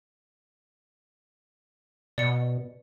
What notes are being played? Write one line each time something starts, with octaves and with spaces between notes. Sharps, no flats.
B2 D5 C#7